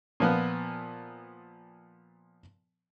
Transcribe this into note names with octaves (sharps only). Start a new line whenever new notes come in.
A#2 F3 B3